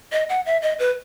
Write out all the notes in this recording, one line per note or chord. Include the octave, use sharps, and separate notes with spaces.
D#5
F#5
E5
D#5
B4